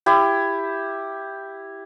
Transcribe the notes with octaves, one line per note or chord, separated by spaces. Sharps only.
E4 G4